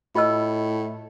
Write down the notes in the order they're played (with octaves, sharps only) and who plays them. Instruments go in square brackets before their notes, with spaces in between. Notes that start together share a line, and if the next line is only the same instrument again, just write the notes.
[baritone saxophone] A2 [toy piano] F4 D#5 E6